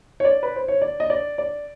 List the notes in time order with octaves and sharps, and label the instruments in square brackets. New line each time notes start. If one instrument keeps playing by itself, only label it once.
[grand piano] C#5
D5
B4
C5
C#5
D5
D#5
D5
D5